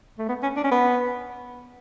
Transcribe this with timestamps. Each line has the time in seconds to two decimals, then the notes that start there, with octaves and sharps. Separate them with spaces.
0.19 A3
0.29 B3
0.43 C#4
0.57 D4
0.64 C#4
0.71 B3